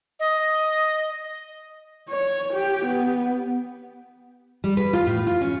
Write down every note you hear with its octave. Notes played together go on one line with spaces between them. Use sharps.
D#5
C#5
G4
B3
G3
B4
F4
A2
F4
C#4